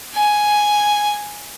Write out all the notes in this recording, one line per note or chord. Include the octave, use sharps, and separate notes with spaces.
G#5